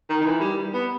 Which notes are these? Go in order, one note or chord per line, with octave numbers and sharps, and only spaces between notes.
D#3
D#3
E3
G3
B3